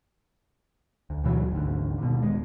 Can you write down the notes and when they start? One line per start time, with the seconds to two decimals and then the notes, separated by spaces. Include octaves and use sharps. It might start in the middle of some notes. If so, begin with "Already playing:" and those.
1.10 D2
1.24 D2 B2 E3 F#3
1.52 G#1 D2
1.98 D#2 B2
2.22 D#1 G#3